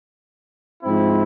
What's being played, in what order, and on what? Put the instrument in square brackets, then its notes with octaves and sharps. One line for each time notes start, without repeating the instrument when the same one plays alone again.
[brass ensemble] G#2 F3 C4 E4